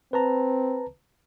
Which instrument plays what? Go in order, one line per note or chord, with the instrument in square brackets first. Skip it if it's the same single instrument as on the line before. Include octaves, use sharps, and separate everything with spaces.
[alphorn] C4 [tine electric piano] B4 A5 A#5